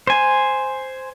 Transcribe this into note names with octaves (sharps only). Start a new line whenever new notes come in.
C5 G#5